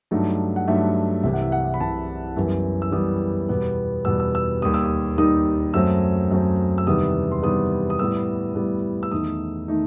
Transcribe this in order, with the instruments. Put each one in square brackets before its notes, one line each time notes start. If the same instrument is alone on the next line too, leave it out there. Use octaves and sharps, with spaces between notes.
[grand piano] G2 F#3 A3 D#4
F#5
G2 F#3 A3 D#4 E5
C2 C3 E3 E5
F#5
E5
F#5
B5
C2 C3 E3 A5
F#2 E3 G3 B3 E5
E6
F#2 E3 G3 B3 D#6
E2 B2 G3 B3
E2 B2 G3 B3 E6
E6
E6
D#2 D#3 G3 D#4 D#6
E6
D#6
D#2 D#3 G3 D#4 D#6
F#2 F#3 A3 C4 E6
F#2 F#3 A3 C4
E6
E2 C3 D#3 G3 B3 D#6
C6
E2 C3 D#3 G3 B3 D#6
D#6
A2 G3 B3 E6
A2 G3 B3
E6
E2 D#3 A3 D#4 D#6
D#3 A3 D#4